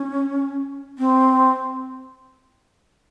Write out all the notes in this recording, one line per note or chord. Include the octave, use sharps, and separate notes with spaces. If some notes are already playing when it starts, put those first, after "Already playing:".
Already playing: C#4
C4